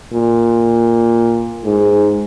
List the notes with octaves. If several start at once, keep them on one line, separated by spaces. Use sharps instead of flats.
A#2
G#2